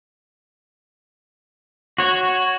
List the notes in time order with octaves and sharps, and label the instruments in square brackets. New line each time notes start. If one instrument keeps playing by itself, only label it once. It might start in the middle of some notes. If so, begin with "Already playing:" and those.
[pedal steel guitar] F#4 C#5